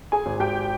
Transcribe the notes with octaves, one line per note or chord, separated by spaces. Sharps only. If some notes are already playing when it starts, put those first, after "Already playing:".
G#4 G#5
G#1
G4 G5